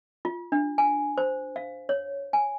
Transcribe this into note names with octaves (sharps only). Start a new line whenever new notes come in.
F4
D4
G#5
C5
F5
C#5
G#5